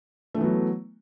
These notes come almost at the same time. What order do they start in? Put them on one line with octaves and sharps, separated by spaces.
A3 E3 B3 F#3